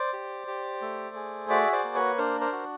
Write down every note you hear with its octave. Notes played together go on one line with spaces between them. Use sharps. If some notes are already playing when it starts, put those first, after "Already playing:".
Already playing: C5 D5
G4
G4
A3
G#4
F#4 D5 E5
C5 D5
A#3
B4 C#5
D4 A#4 C5
A#4 C5
F#4